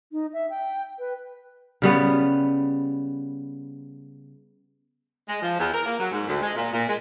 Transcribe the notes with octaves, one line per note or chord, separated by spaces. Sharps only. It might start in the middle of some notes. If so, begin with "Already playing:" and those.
D#4
E5
G5
B4
C#3 G3 B3
G#3
F3
E2
A#4
A#3
F#3
G#2
D2
G#3
A#2
A#2
G#3